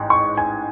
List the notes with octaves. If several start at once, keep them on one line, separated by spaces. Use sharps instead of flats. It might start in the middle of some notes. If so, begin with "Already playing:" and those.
Already playing: A1 G#2 G#3
C#6
G#5